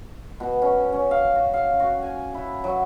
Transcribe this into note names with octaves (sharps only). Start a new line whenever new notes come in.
B2
C#4
C#4
F5
F#4
F5
F#4
G#5
E4
F#3